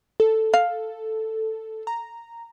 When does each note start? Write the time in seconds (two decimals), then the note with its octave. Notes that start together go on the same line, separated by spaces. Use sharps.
0.20 A4
0.54 F5
1.87 A#5